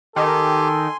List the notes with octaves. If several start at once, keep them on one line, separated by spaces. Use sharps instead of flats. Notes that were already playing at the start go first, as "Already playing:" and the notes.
D#3 G4 A4 G#5 C6